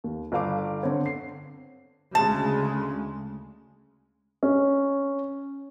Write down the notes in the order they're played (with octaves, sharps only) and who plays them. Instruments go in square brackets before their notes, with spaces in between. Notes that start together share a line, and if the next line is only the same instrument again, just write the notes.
[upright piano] D#2
G1 A4 F5 D6
D3 C4 C#5
C7
[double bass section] D2 C#3 G#3 [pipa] A5
[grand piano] C#4